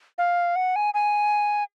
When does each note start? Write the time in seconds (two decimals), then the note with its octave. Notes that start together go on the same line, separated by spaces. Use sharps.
0.18 F5
0.56 F#5
0.76 G#5
0.94 G#5